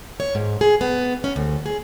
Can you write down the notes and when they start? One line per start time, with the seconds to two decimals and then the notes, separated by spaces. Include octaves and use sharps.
0.20 C#5
0.35 G#2
0.61 G#4
0.81 B3
1.24 C#4
1.36 D2
1.66 G#4